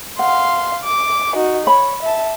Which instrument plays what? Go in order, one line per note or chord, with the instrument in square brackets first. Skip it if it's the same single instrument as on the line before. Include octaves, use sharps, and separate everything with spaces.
[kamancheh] F5 C6 [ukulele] F#5
[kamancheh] D6
D#4 F#4
[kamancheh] C#5 [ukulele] B5
[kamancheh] E5 A5